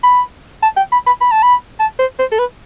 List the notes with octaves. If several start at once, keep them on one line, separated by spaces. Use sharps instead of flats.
B5
A5
G5
B5
B5
B5
A5
B5
A5
C5
C5
A4
B4